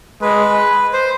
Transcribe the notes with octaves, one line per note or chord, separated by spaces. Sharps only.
G#3 B4
C5